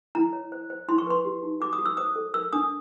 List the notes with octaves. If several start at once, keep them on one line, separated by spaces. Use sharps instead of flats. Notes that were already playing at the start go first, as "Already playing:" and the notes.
E4 A#5
C#5
C5
C5
E4 C6
C#6
B4 C6
G4
D#4
F#4 D6
D#6
F#4
E6
C5 D#6
A4
A#4 E6
D4 D#6